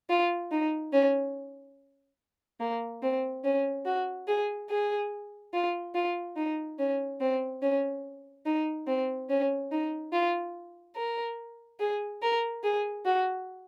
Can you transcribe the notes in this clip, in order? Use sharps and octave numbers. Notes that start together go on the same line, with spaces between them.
F4
D#4
C#4
A#3
C4
C#4
F#4
G#4
G#4
F4
F4
D#4
C#4
C4
C#4
D#4
C4
C#4
D#4
F4
A#4
G#4
A#4
G#4
F#4